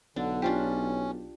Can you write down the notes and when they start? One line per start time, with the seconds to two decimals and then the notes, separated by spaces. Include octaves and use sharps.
0.16 B1 D3 D4
0.42 C#4 D4 F4 G4